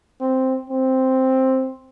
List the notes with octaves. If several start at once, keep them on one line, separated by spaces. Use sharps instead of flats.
C4
C4